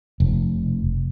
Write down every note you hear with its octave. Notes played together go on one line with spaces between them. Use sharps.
F1